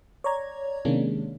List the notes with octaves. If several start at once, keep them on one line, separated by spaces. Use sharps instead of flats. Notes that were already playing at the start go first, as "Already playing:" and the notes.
C#5 D5 A#5 G#6
C3 D#3 G#3 A#3 C#4 D4